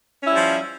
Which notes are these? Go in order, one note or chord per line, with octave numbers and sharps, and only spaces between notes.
F3 G3 C#4 E4